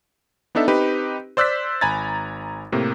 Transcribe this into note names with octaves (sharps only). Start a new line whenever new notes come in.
B3 D4 D#4 A4 E5
C4 D#4 G4 B4
C5 D5 E6 F#6 G6 B6
G#1 G#5 A#5 B5 G#6 A6
A2 C3 A#3